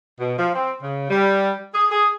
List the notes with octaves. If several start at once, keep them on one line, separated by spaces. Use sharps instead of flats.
B2
F3
C4
C#3
G3
G#4
G#4